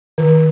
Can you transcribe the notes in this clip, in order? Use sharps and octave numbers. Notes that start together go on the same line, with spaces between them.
D#3